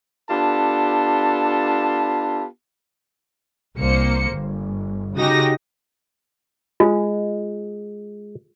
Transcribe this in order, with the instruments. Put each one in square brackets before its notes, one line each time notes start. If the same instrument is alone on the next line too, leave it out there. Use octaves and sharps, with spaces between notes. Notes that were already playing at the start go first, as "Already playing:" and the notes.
[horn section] B3 D4 F4 G4 A4 A5
[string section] C2 A#3 C5 C#7
G1
C#3 D#4 F#4 G4 D#6 A#6
[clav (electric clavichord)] G#3 [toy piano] F4